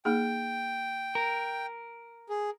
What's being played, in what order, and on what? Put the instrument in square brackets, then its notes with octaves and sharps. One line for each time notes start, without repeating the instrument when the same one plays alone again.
[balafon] A#3 D#4 G#4 [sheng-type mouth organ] G5
[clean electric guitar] A#4
[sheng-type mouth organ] G#4